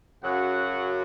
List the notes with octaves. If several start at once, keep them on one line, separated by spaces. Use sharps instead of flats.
F#2 C#3 F#3 F#5